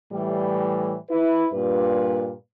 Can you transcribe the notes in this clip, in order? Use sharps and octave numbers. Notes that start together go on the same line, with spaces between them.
A2 E3 G3
E4 B4
G2 A#2 B4